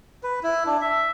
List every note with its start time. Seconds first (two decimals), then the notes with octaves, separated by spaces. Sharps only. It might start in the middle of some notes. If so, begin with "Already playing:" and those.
0.23 B4
0.43 E4
0.66 D4
0.81 E5